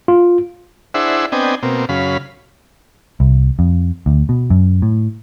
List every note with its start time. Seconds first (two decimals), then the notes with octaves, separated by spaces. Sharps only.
0.08 F4
0.94 D4 E4 G#4 C5 E5 F#5
1.32 B3 C4 D4 D#5 G5 G#5
1.63 B2 A#3 C4
1.89 F#2 C#3 F5 B5
3.20 C2
3.59 F2
4.06 D2
4.29 B2
4.50 F#2
4.82 A2